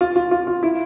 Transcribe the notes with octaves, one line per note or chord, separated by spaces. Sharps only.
F4
F4
F4
F4
E4